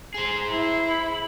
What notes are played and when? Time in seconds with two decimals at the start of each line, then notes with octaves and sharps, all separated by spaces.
0.14 G#4 C5
0.49 E4
0.88 B5